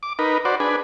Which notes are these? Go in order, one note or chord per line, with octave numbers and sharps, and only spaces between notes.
D6
D#4 A#4 B4
F#4 C5 D5
D4 G#4 B4